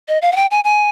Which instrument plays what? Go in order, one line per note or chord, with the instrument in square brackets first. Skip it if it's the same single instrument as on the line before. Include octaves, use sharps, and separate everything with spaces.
[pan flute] D#5
F5
F#5
G5
G#5
G#5